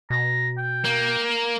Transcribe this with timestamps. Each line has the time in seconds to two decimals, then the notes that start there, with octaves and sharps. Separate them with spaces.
0.10 B2 A#5
0.58 G5
0.85 A#3